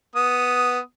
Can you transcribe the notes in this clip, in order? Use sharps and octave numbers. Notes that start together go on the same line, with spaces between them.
B3 D#6